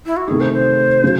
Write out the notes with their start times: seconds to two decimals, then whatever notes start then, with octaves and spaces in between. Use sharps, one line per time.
0.06 E4
0.17 F#4
0.28 C3 D#3 A3 D#4 G#4
0.40 C5
0.53 C5
1.04 C#3 F#3